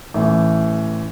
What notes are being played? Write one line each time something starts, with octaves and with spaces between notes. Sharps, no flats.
A1 A2 E3